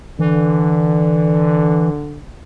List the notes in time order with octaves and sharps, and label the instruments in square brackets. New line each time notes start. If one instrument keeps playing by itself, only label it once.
[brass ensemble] D3 [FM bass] E3